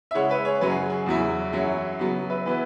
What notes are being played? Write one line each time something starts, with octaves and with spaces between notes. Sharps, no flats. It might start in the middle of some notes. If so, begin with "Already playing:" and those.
E5
C#3 G#3 E4 C#5 F#5
B4 E5
G#4 C#5
F#2 C#3 F#3 B4
G#4
G#4
E2 C#3 F#3 E4
F#2 F#3 C#4 E4
C#3 F#3 B3
B4 E5
E3 B3 E4 B4